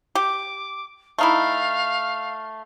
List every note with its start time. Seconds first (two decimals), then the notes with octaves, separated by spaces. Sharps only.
0.15 G4 D6
1.18 A3 D#4 E4 F5